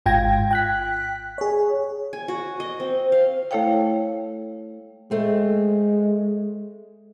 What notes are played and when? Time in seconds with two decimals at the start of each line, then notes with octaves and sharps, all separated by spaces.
0.06 G#1 G#2 F4 G5 G#6 A#6
0.51 G5 F#6 B6
1.38 G#4 C#5
2.13 G#5
2.28 F#4
2.60 D#5
2.80 C4
3.12 F5
3.51 A3 E4 A4 C#5 F5 G5
5.11 G#3 A3 C4